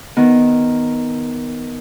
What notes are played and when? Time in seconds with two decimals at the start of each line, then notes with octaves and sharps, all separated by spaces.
0.16 D#3 B3